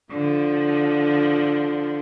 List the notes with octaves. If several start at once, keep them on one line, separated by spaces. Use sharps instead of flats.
D3 F3